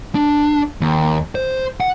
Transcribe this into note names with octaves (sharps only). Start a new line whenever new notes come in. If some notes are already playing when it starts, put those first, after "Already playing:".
D4
D#2
C5
F#5